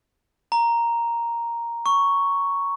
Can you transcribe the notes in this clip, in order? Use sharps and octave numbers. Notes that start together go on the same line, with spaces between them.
A#5
C#6